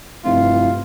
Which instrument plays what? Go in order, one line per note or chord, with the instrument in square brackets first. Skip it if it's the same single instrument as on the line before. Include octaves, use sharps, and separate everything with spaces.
[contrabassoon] F1 [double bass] G2 C3 [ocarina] E4 [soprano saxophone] F4